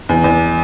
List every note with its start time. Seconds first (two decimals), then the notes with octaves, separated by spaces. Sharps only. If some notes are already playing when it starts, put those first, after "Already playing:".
0.09 E2
0.24 E2